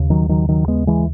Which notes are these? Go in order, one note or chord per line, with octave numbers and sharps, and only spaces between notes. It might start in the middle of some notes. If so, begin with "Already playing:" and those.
Already playing: D#2 C#3
D#3 F#3
D#3 F#3
D#3 F#3
G#3 B3
E3 G#3